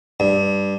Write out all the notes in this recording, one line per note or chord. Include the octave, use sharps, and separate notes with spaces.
G2